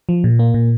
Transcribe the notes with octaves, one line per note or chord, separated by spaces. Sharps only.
F3
A#2
A#3
A#2